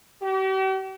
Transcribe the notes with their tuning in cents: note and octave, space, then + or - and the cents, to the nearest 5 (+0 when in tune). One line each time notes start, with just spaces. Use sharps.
G4 -45